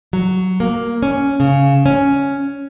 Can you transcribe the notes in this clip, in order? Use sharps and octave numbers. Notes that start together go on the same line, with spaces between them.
F#3
A#3
C#4
C#3
C#4